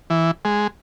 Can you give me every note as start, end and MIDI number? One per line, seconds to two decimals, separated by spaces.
0.10 0.31 52
0.45 0.67 56